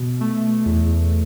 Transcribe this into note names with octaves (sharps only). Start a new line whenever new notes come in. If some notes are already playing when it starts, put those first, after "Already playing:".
Already playing: B2
A3
E2